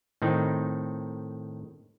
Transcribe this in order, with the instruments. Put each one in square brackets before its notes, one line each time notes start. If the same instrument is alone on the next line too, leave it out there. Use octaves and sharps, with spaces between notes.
[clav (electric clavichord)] A2 D#3 C4 D#4